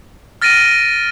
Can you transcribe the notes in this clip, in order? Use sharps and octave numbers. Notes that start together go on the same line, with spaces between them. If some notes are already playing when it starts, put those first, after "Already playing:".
F6 A6 A#6 D7 D#7